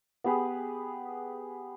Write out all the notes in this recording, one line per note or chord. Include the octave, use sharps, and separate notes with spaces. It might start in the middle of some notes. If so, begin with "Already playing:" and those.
B3 G4 G#4 B4